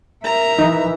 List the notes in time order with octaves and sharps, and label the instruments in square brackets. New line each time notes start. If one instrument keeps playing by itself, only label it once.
[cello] A#4 E5 [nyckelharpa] A#5
[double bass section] E3 [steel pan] D#4